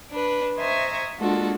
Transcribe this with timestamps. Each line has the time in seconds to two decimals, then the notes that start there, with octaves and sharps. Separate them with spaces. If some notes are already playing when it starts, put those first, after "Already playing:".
0.11 D4 B4
0.56 C5 D#5 E5 G#5 A#5 C#6
1.18 G#3 A#3 D4 F4 F#4 A4